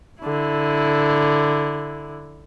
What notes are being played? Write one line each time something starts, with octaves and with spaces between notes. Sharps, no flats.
D3 E4